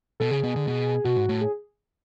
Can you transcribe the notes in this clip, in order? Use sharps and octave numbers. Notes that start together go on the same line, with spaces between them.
B2 A4
C#3 G#4
B2
D3
B2
B2 F#4
G#2
A2
G#4